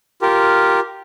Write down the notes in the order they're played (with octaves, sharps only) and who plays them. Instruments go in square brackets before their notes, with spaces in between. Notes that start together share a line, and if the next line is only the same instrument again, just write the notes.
[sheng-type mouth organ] F4 G4 A#4